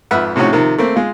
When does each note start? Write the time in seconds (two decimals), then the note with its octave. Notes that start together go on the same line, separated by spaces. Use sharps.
0.11 G#1 F2 B4 E5 F#5 F6
0.36 A2 C3 F3 C#4 D#4 F#4
0.52 C3 D#3 F3 A#4
0.78 A3 A#3 C4
0.96 G#3 F4